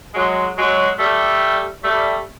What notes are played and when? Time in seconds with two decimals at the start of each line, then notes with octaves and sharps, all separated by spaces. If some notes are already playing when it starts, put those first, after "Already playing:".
0.13 F#3 G#3
0.56 F#3 G#3
0.98 G3 A3
1.83 G3 A3